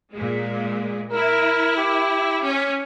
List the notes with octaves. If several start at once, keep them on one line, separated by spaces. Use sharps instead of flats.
A#2 G#3
E4 A#4
G4
C#4